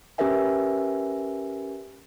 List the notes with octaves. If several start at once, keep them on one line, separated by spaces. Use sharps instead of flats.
C#4 G4 A#4 B4 E5 G#5